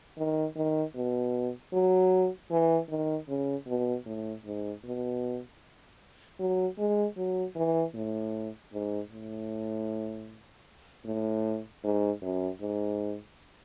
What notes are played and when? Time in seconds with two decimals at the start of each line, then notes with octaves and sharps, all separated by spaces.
0.18 D#3
0.56 D#3
0.96 B2
1.73 F#3
2.51 E3
2.90 D#3
3.29 C#3
3.68 B2
4.06 A2
4.45 G#2
4.84 B2
6.39 F#3
6.78 G#3
7.17 F#3
7.56 E3
7.95 A2
8.73 G#2
9.12 A2
11.05 A2
11.84 G#2
12.22 F#2
12.61 G#2